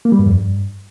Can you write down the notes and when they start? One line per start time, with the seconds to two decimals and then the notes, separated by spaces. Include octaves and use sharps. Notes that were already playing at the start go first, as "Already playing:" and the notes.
0.05 A#3
0.12 G3
0.19 G2
0.26 F2
0.33 G2